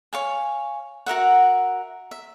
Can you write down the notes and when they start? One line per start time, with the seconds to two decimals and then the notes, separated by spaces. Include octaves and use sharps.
0.13 C#5 F5 G#5
1.06 F#4 A#4 E5 F#5
2.11 E5